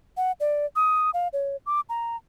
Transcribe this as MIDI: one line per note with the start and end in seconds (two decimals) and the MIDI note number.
0.17 0.32 78
0.40 0.66 74
0.76 1.10 87
1.14 1.28 77
1.33 1.56 73
1.66 1.80 86
1.89 2.17 82